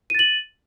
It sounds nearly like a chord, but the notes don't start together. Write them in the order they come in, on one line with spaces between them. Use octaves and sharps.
D#7 A6 F#7